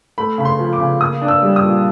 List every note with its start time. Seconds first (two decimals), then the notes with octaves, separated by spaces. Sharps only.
0.18 A3 B5
0.38 C#3 B5
0.45 C6
0.59 F3
0.73 D6
0.80 C#3
1.01 A#3 D#6
1.22 D4
1.28 E6
1.42 G3
1.56 D#6
1.63 A#2